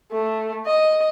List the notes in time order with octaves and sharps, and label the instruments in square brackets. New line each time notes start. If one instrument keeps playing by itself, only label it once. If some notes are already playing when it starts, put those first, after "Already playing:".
[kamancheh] A3
D#5